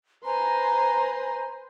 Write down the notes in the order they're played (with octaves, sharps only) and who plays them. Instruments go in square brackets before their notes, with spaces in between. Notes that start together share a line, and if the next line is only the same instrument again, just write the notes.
[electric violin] B4 C6 [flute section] C5 G#5 [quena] A#5